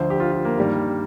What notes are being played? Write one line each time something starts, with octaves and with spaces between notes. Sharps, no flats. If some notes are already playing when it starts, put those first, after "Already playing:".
Already playing: D2 D3 F3 C5
G4
F4
F4
A#3
G2 D#3 G3